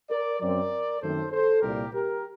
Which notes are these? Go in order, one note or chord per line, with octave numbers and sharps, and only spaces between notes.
A#4 D5
F#2 F#3 C4 A#4 D5
F#2 D#3 A3 C4 A4 C5
A4 C5
C2 A#2 G3 A#3 G4 A#4
G4 A#4